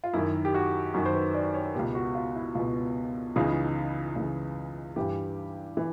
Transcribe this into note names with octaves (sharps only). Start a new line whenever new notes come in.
F4
F#2 D#3 E4
G4
F#4
F#2 D#3 F#4
C5
B4
D5
C#5
C#2 B2 G4
F#4
F4
E4
C#2 B2
C#2 C#3 E3 D#4
C#2 C#3 E3
G2 E3 G4
E3